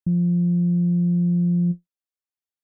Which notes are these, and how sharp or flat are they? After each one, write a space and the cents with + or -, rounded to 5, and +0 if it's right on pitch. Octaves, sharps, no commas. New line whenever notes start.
F3 +0